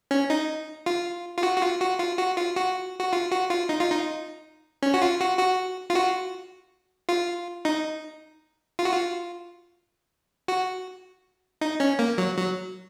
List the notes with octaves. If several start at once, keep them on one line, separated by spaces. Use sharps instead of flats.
C#4
D#4
F4
F4
F#4
F#4
F4
F#4
F4
F#4
F4
F#4
F#4
F4
F#4
F4
D#4
F4
D#4
C#4
F#4
F4
F#4
F#4
F4
F#4
F4
D#4
F4
F#4
F4
F#4
D#4
C#4
A#3
F#3
F#3